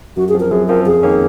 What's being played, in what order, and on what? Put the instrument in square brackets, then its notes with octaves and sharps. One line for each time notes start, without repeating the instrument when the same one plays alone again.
[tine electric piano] F#2 [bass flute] F#4
[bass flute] G#4
[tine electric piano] F3 C4
[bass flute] A#4
[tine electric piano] F#2 [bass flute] G#4
[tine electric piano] F3 C4 [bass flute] A#4
[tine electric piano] F2 [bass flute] G#4
[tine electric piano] D#3 A#3 C#4